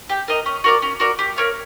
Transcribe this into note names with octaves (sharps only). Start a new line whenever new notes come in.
G4
A#4 D#5
C#4
F#4 A#4 D5
C#4
F#4 A#4 D5
G4
A#4 C#5 F5